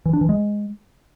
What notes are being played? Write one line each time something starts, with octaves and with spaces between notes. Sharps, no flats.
E3
D4
E3
G#3